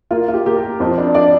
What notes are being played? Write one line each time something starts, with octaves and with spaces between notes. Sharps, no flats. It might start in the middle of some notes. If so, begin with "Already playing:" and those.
A#3 F4
F4
G4
A#3 G4
A#4
A#3
F2 C5
D4
D4 D5